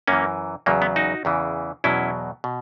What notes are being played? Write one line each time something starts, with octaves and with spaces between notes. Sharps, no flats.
F#2 E3 A#3 C#4
E2 C#3 F#3 A#3
B3
D#4 F#4
E2 C#3 E3
E2 B2 F#3 C#4 E4
B2